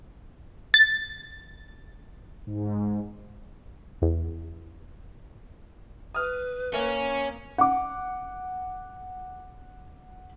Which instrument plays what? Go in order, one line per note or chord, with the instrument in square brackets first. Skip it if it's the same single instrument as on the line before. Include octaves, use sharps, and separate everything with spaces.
[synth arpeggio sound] A6
[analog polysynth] G#2
[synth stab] E2
[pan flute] B4 [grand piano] D#6 F6
[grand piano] A#3 [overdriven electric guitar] C#4
[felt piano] F#5 D6